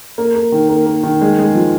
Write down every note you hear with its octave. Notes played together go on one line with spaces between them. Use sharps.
A#3
A#3
D#3
A#3
A#3
D#3
G#3
G#3
F3